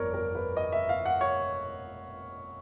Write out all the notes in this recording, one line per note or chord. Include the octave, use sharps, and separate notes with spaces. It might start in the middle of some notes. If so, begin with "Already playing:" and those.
Already playing: G1 F2 A#4 C#5 D5
A#4
B4
D#5
E5
F5
F#5
C#5